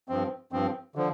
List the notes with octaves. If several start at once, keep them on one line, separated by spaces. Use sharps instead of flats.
G2 F3 C4
G2 F3 C4
D3 F3